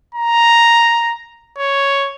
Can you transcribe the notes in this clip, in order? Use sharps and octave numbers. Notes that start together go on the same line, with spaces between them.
A#5
C#5